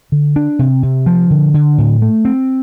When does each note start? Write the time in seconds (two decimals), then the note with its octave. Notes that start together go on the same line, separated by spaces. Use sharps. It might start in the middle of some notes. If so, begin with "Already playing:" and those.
0.12 D3
0.36 D4
0.59 C3
0.83 C3
1.06 F3
1.30 D3
1.54 D3
1.78 A2
2.02 A3
2.25 C4